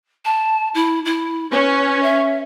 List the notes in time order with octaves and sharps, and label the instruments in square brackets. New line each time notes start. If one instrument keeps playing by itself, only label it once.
[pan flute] A5
E4
E4
[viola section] C#4 [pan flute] B4
[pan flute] E5